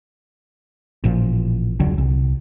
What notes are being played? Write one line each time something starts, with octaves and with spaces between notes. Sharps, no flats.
A1 A#2 F3
E1 C#2 D3 F#3
C2